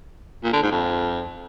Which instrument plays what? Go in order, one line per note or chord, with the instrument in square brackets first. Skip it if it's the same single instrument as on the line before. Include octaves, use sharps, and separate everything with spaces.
[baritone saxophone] A#2
D3
G#2
F2